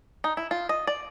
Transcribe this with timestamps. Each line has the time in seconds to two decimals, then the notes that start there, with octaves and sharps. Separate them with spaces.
0.24 D#4
0.37 E4
0.51 F4
0.69 D#5
0.87 D5